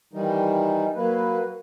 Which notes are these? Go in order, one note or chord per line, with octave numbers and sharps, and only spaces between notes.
D#3 E3 G3 D#4
F#3 A#3 B4